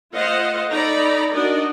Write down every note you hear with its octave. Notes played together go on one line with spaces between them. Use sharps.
A3 F4 C5 D#5 F5 F#5
D#4 A4 D5 A#5 B5
D4 D#4 F#4 A#4 D5 D#5